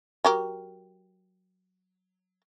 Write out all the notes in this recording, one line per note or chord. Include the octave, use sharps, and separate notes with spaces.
F#3 G4 A#4